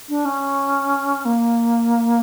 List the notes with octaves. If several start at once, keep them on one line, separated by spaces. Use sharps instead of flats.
D4
C#4
A#3